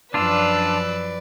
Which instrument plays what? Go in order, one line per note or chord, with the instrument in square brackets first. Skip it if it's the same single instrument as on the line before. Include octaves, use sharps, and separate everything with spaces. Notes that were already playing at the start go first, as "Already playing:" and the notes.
[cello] F#2 F3 [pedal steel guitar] D4 F4 [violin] B4 D5 [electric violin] E6 F#6